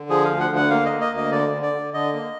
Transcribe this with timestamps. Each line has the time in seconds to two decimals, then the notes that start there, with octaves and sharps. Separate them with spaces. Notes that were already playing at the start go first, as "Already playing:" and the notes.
Already playing: D3
0.10 F3 G#4
0.25 D2 F5
0.40 F#5
0.50 D3
0.56 F#5
0.70 A#3 F5
0.86 D#5
0.92 A#3
1.01 D#5
1.12 D2 D#5
1.32 D3 D5
1.52 D3
1.62 D5
1.73 D3
1.94 D3 D#5
2.13 A#3